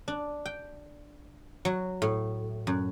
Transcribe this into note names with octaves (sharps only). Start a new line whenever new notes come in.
D4
G5
F#3
A2
F#2